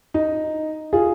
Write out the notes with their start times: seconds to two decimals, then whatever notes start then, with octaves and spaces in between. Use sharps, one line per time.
0.14 D#4
0.93 F4 G#4